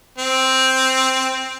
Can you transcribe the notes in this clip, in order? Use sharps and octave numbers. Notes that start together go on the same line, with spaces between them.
C4